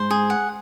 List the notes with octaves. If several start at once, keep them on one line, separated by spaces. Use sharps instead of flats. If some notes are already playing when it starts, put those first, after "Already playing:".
Already playing: G#2 C5
G#4
F#5